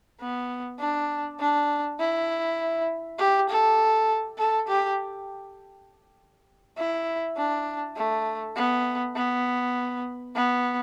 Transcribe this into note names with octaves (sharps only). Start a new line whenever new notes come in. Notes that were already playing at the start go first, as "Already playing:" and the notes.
B3
D4
D4
E4
G4
A4
A4
G4
E4
D4
A3
B3
B3
B3